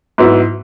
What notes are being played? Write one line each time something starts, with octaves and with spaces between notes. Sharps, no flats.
G#2 F#3 B3 E4